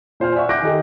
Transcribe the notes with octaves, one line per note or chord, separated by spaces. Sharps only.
A#2 C5 G#5 F6
D5 E5 F#5 C#6
G#5 D6 F#6 G6 A#6 D7
D#3 D#4 G4 A4